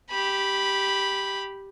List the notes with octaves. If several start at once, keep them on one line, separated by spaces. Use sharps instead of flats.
G4 B5